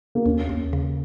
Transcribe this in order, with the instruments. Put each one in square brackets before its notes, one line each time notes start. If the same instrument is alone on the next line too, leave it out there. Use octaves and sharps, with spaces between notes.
[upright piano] A#3
[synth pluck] D#2 [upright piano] C#4
[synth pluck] D#2
C#3